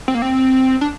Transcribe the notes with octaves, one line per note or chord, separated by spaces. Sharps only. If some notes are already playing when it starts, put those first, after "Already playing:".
C4
A#3
C4
D4